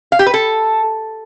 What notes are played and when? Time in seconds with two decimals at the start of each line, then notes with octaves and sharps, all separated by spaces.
0.12 F5
0.19 G4
0.26 B4
0.34 A4